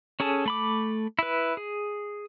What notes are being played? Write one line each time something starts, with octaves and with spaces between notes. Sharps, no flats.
C#4 G#4 A4 A5
A3 B5 D6
E4 B4
G#4